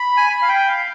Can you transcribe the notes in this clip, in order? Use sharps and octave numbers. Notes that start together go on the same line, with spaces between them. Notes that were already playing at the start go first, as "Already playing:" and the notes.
Already playing: B5
G#5
B5
F5
G5
F5